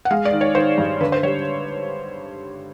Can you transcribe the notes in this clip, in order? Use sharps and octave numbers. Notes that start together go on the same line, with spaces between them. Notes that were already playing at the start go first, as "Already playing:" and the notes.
F#5
G#3 F5
D5
D#3
C#5
D#3 C5
G2
D3 B4
C5
G3 C#5